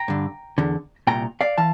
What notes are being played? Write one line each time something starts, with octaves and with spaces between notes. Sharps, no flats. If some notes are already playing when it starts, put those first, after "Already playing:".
Already playing: G5 A#5
G2 D3
E2 D3
C2 A#2 G5 A#5
D5 F5
E3 F5 A5